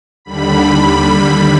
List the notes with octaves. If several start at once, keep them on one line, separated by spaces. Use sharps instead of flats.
D#2 D3 G3 B5